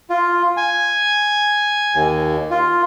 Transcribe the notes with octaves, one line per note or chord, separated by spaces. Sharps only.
F4
G#5
D#2
F4